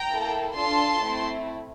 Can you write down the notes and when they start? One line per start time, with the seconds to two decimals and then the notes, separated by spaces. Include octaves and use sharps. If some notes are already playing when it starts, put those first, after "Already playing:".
Already playing: G5 A#5
0.08 A#3 E4 A4
0.55 D4 F4 A4 A5 C6
1.02 A3 C4 E4